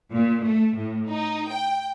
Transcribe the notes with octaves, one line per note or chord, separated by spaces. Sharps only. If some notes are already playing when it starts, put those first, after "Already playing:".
A#2
A3
A2
D#4
G5